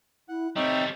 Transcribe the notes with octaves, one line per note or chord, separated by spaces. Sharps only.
E4 F#5
G3 A3 C4 D#4 C#5 E5 G5